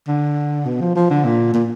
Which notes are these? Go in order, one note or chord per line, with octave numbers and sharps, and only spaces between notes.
D3
B2
F3
F3
D3
A#2
A#2